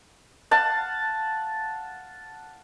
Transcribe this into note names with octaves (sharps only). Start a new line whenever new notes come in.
F5 F#5 A5